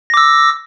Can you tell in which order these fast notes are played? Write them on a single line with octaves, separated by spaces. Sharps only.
A#6 D6 E6